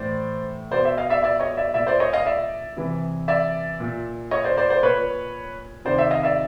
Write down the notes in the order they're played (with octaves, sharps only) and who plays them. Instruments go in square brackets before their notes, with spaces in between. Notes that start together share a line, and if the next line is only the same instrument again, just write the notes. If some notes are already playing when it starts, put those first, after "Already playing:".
Already playing: [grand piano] A2 E3 C5 D5
B2 C5 D5
D5 E5
D#5 F5
D5 E5
D5 E5
C#5 D#5
D5 E5
A#2 D5 E5
C5 D5
C#5 D#5
D#5 F5
D5 E5
C3 E3
D5 E5
A#2
C#5 D#5
C5 D5
C5 D5
C5 D5
A#2 B4 C#5
C3 D#3 C5 D5
D5 E5
D#5 F5
D5 E5